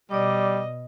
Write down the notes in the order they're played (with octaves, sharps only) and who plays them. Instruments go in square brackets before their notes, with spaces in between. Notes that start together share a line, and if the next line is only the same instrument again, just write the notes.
[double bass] B2 [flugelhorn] G3 [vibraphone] D5 D6 [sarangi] D#5